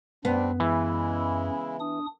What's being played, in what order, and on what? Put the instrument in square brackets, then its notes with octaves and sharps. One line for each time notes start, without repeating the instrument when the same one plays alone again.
[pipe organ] F#2 [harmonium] G3 C4 D4 [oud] B3
[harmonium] C#3 G#3 E4 [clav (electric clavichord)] E3
[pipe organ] D4 D#6